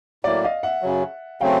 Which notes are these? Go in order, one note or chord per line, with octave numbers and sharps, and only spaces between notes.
A2 F#3 A#3 D5 E5
D#5 F5
E5 F#5
F#2 C#3 F#3
C#3 F#3 A3 C4 F5 G5